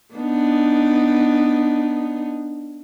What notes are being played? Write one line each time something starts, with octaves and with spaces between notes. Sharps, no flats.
B3 D4 D#4